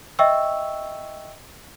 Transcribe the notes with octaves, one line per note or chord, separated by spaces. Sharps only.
D#5 E5 G5 C#6 E6